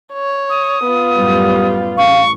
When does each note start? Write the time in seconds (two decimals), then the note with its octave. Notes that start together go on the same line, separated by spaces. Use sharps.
0.13 C#5
0.50 D#6
0.85 B3 F4
1.15 F#2 A2 G3
1.97 A1 F5 C#6